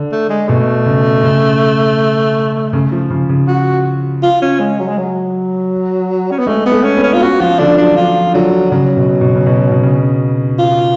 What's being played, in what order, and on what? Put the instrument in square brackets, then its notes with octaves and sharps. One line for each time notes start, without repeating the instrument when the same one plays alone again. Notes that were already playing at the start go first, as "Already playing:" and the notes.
Already playing: [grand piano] D3
[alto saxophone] A3
G#3
[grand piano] B2 [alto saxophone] A3
[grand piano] C#3
C#3
C#3
F3
C#3
C#3
[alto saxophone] F#4
F4
C#4
G#3
F#3
G#3
F#3
C#4
B3
[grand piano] G#3 [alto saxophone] A3
[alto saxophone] B3
[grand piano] A3
[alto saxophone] C#4
[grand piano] B3
[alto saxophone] C#4
F4
[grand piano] B3
[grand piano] C#4 [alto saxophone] F#4
[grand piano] F3 [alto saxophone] F4
[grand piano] D3 [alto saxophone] D4
[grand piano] F#3 [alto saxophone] D4
[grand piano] F3 [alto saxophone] F4
[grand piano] D3 [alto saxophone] F#3
[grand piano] C#3 [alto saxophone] F#3
[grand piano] B2
B2
C#3
B2
B2
C#3
[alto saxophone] F4